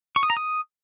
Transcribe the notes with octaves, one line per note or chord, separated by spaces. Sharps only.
C#6
D#6
A#5
D#6